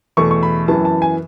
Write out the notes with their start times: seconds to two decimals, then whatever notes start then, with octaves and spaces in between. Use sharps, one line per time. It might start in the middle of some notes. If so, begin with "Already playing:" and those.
0.17 E2 B2 A3 C#6
0.31 C#6
0.43 B5
0.68 F#2 E3 B3 A5
0.85 A5
1.02 G#5